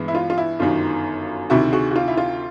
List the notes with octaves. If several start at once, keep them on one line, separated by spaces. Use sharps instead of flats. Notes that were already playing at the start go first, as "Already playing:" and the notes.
Already playing: G2 E3 G#3 B3
E4
F4
F4
E4
G1 F#2 D#3 F4
D2 C3 D#3 E4 F#4
F#4 G#4
F#4
F4
E4
F4